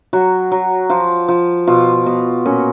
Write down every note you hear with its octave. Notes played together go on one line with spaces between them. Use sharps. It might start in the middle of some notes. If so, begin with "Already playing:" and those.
F#3 F#4
F#3
F3 F4
F3
B2 F4
B2
A#2 C#4